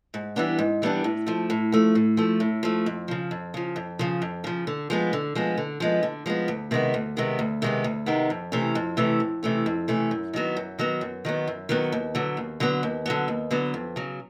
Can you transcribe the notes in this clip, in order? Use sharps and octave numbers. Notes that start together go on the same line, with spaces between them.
G#2
E3 G3 B3 D4
G#2
E3 G3 B3 D4
A2
F3 A3
A2
F3 A3
A2
F3 A3
A2
F3 A3
F2
C#3 F3
F2
C#3 F3
F2
C#3 F3
F2
C#3 F3
D3
F3 G#3 B3
D3
F3 G#3 B3
D3
F3 G#3 B3
D3
F3 G#3 B3
D2
C3 D#3 G#3 B3
D2
C3 D#3 G#3 B3
D2
C3 D#3 G#3 B3
D2
C3 D#3 G#3 B3
F2
C3 E3 A3 C#4
F2
C3 E3 A3 C#4
F2
C3 E3 A3 C#4
F2
C3 E3 A3 C#4
F#2
D#3 F#3 B3
F#2
D#3 F#3 B3
F#2
D#3 F#3 B3
F#2
D#3 F#3 B3
D#2
D3 F#3 B3
D#2
D3 F#3 B3
D#2
D3 F#3 B3
D#2
D3 F#3 B3
F2
C#3 F#3